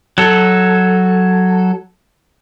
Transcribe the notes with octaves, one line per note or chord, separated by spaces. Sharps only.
F#3 A4